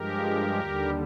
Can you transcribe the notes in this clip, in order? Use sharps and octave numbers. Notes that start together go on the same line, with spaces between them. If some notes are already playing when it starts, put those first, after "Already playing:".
Already playing: G2 F3 G#3 G4 A#4
D#2 D3 G3